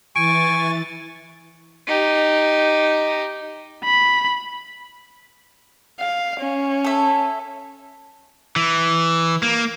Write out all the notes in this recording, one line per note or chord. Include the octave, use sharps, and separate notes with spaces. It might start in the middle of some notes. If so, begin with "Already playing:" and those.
E3 G#5 C#6 A6 D7
D#4 G4
B5
F5
C#4
A4 E5
E3
A#3